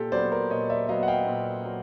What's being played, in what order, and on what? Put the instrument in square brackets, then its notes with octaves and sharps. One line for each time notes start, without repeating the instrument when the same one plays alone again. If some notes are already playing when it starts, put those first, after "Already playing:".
Already playing: [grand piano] A#2 G4 A4
F#3 B3 C5 D5
A#4 C5
A#2 C#5 D#5
D5 E5
F#3 B3 D#5 F5
F#5
F5 G5
A#2
F#3